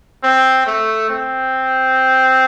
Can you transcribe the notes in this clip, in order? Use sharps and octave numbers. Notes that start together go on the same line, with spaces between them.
C4
A3
C4